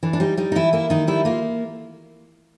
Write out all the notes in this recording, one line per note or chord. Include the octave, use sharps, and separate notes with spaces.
E3 D4
D4
G3 D#4
G3 D#4
D#4
E3 E4
A#3 E4
D#3 D#4
G3 E4
A#3 F4